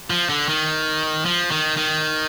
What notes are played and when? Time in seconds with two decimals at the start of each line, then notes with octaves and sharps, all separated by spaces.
0.10 F3
0.29 D3
0.49 D#3
1.25 F3
1.51 D#3
1.77 D#3